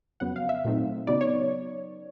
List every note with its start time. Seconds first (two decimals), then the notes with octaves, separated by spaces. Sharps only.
0.20 F2 C#3 F#3 B3 F#5
0.36 F5
0.49 E5
0.65 A#2 F#3 A3 C4 D#4
1.07 C#3 F#3 B3 D#4 D5
1.21 C#5